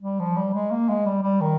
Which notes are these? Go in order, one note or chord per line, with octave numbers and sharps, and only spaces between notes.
G3
F3
G3
G#3
A#3
G#3
G3
G3
D#3